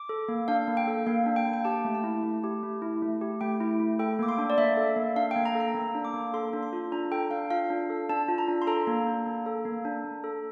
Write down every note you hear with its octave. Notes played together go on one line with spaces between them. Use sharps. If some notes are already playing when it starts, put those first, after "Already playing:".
Already playing: D6
A4
A#3
D4 F5
A#3
G5
A4
A#3 F5
D4
G5
A#3
G5
G4 A5
A3
A5
E4
A3
G4
A3
E4
A3
G4
A3 G5
E4
A3
A4 G5
A#3 D6
C6
D4
D5
A#3 E5
A4
A#3
D4 F5
A#3 G5
A#5
A4
A#5
A#3
D4
D6
A#3
A4 C6
D4
C6
F4
D4 A#5
A4 G5
D4 F5
F4 F5
D4
A4
D4 A5
F4
A#5
D4
C6
A4 A#5
A#3
D4
A#3
A4
A#3
D4
A#3
A4